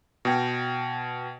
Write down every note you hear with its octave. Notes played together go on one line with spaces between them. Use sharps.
B2 G5